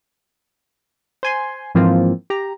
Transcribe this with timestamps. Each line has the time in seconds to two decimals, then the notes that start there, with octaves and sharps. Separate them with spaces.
1.23 C5 G#5 C6
1.75 G#2 E3 F3 A#3 C4 F4
2.30 G4 A#5